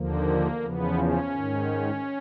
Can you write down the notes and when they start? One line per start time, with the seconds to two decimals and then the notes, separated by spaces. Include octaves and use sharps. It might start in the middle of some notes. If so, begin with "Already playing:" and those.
Already playing: D#2 D3 F3 A#3
0.62 E2 C#3 F3 B3
0.97 C#4
1.33 G#2 D#3